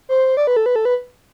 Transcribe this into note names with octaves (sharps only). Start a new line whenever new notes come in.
C5
D5
B4
A4
B4
A4
B4